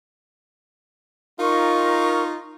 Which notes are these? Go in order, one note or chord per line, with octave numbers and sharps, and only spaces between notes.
D#4 F4 A#4 C#6